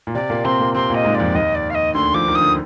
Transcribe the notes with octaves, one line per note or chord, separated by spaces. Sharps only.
A#2
C3 D5
A#2 A#3
C3 C4 C6
A#2 A#3
C3 C4 C6
A#2 A#3 D#5
G#2 G#3
D5
F2 F3
D#2 D#3 D#5
D5
F5
D#5
D2 D3 C6
F3 D6
D#3
D#6
D3